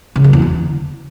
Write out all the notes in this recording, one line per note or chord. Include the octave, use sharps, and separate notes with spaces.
C#3
F#3
E2
D3